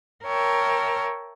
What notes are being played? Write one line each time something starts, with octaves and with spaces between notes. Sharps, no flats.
A#4 C#5 E5 G5 A5